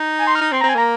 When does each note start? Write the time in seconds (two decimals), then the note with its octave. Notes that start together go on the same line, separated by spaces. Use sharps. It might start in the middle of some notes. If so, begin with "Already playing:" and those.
Already playing: D#4
0.18 G#5
0.27 C6
0.35 F6
0.41 D#4
0.52 C4 C6
0.61 A#5
0.64 C4
0.69 G#5
0.75 A#3 A#5